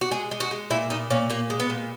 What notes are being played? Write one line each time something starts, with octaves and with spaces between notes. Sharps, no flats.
F#4
G#3 G#4
G#3
F#4
G#3
A#2 E4
A#2 D#4
A#2 C#4
A#2 A#3
G#3
B3
A#2